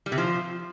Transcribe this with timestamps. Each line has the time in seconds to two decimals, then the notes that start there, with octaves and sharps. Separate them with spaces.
0.06 G3
0.12 C3
0.18 F3